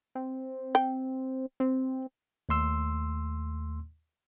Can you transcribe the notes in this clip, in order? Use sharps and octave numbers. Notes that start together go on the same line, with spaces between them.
C4
G5
C4
D#2 A3 C6 E6